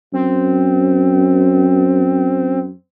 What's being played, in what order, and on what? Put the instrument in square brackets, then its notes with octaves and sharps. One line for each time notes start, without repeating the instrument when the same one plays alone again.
[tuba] F#2 [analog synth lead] C4